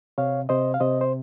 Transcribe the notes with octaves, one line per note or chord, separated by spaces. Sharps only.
C3 C#5 F5
C3 C5 D#5
F5
C3 C5 D#5
C5